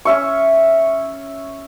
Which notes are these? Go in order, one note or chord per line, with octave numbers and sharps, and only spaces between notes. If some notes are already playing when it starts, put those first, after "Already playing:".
C#4 E5 C#6